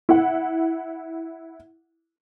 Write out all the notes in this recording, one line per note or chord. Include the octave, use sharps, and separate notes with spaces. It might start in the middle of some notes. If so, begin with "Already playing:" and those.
E4 F#5